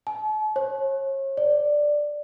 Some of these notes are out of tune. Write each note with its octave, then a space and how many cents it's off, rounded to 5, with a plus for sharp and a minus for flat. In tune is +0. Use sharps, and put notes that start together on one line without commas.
A5 -40
C#5 -35
D5 +5